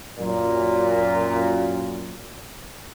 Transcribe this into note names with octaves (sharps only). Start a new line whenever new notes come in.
F#2 A#2